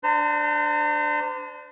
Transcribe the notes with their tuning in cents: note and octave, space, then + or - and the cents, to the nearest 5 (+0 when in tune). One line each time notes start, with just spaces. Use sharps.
D4 +0 C5 -35 A#5 -45